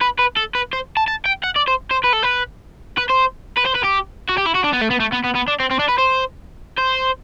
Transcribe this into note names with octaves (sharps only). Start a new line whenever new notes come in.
B4
B4
A4
B4
C5
A5
A5
G5
F#5
D5
C5
C5
B4
A4
B4
B4
C5
B4
C5
B4
G4
F#4
G4
E4
F#4
D4
B3
A3
B3
A3
B3
B3
B3
D4
C4
C4
D4
B4
C5
C5